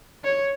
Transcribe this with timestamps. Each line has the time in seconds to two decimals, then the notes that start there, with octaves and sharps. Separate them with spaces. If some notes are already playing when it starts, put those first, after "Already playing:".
0.24 C#5